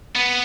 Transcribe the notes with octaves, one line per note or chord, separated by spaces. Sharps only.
B3